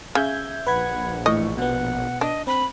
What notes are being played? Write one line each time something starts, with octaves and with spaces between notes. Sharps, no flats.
C#3 E5 G6 G#6
A#1 B4 F#5 B5 G#6
A2 E3 D#5 C#6
B2 B3 F#5
D4 D#5
C4 B5